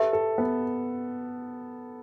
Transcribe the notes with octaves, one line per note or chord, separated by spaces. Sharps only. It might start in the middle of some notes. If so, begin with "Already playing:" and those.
Already playing: G4 A4 B4 E5
A4
B3